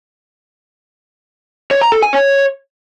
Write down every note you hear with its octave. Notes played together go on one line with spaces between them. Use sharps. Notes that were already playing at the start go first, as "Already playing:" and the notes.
C#5
A#5
A4
G#5
C#5